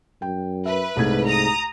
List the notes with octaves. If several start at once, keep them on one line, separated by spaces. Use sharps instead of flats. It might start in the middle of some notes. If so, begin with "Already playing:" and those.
F#2 G5
B4 E5
C2 G#2 A3 G#6
A#5 D#6